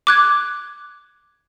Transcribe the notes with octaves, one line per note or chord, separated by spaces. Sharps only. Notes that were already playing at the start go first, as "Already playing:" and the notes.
D6 F#6 G#6